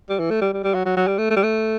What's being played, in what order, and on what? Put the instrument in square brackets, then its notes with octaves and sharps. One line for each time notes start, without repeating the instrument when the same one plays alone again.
[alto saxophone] G3
E3
A3
G3
G3
G3
F#3
F#3
F#3
G3
A3
A3
G3
A3